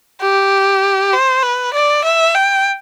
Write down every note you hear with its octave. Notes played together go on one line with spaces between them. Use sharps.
G4
C5
B4
D5
E5
G5